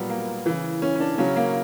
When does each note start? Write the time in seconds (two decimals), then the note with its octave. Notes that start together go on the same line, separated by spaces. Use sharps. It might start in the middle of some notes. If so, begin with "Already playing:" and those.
Already playing: A#2 F#3 G3 B3
0.10 A#3
0.46 C#3 E3
0.82 C#4
0.95 C#4
1.00 D4
1.18 C#3 F#3 C#4
1.36 A#3